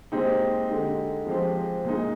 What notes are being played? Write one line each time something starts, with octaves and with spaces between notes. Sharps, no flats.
A#2 G#3 C4 D#4 G4
D3 G#3 D#4 G4
F3 G#3 C4 G4
A#2 G#3 D#4